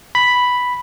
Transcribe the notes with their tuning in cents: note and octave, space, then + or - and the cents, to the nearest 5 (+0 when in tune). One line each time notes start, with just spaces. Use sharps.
B5 +0